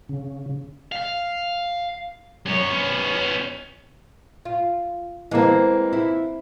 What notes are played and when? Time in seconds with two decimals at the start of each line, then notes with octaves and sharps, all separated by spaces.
0.09 C#3
0.92 F5
2.46 F#2 C#5
2.70 B3 C#4
4.45 F4
5.31 E3 G#3 A#3 C4
5.93 E4